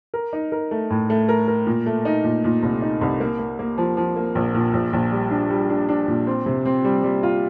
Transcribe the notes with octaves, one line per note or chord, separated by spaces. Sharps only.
A#4
D#4
A#4
A3
A2
A3
A#4
A#4
A#2
A3
D#4
A#2
A#2
C2
D#4
C2
A#3
A#3
A#3
F3
F3
A#3
A#1
A#2
A#1
A#1
G3
D4
G3
D4
D4
A#2
C4
C3
C4
G3
G3
F4